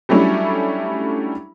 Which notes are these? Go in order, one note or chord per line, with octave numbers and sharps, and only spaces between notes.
F#3 G3 A3 C#4 D4 E4